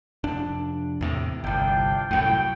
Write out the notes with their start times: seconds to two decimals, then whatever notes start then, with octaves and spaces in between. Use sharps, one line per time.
0.24 F1 D4
1.01 E2 A2 C3
1.44 G1 C2 D4 F4 G5
2.11 C2 F#2 A2 G5